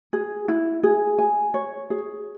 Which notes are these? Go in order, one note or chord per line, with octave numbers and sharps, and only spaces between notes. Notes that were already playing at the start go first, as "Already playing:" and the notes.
G#4
E4
G#4
G#5
C#5
G#4